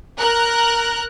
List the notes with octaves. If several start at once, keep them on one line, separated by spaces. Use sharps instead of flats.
A#4 F#6